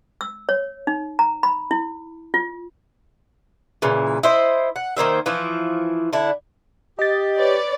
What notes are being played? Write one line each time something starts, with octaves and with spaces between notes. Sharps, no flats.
E6
C#5
D#4
A#5
B5
E4
F4
A#2 C#3 E3
E4 C5 D#5
F#5
D#3 A#3 C5 E5
E3 F3 E4
D3 D4 E4
G4 D#5 A6
B4 C#5 D5